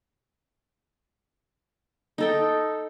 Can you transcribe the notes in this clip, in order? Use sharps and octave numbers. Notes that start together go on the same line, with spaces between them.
D#4 A4 G5